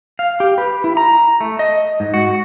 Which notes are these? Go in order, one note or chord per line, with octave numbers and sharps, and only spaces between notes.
F5
G4
B4
E4
A#5
A3
D#5
G#2
F#4